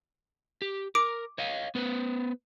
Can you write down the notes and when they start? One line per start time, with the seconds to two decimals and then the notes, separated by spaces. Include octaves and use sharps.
0.62 G4
0.95 A#4 D6 D7
1.38 C#5 D#5 F5
1.75 B3 B4 C5